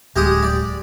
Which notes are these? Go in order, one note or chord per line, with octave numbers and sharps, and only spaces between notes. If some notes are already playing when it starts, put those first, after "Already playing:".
D1 G#3 G4 D#6
D5